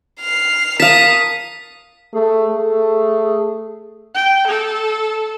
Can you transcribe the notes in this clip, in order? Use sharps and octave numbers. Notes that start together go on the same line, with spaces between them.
F6 C7
A#4 F5 A5 D#6 B6
A3 G#4
A3
G5
A4